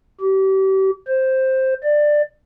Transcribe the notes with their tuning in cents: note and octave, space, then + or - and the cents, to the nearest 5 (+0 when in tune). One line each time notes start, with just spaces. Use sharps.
G4 -35
C5 +5
D5 +15